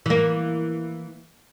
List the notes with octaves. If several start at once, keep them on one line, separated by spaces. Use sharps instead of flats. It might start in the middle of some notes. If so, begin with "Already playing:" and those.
E3 A#3